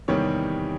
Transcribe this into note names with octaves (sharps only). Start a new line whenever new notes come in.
E2 C3 D#3 G3 A#3 C#5